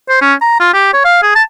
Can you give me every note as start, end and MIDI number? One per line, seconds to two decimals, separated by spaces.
0.09 0.19 72
0.22 0.34 61
0.41 0.58 82
0.60 0.70 65
0.74 0.92 67
0.94 1.01 73
1.05 1.19 77
1.23 1.31 68
1.36 1.43 81